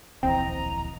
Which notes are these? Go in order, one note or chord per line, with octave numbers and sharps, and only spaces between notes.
D1 A#1 E3 C4 D#5 A#5